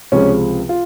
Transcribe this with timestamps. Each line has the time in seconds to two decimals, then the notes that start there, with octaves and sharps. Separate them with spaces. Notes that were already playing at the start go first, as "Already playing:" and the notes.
0.12 C#2 C3 F3 G#3 C#4
0.69 F4